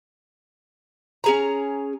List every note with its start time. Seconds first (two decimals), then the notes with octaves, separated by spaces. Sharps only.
1.24 C#4 G#4 A#5